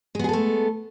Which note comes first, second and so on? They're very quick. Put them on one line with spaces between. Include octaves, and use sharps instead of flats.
G#3 B3 G#4 A4 A3